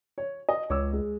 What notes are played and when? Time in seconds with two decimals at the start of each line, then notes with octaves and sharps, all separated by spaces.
0.18 C#5
0.49 D#5
0.70 C#2 C#5 D6 E6
0.93 G#3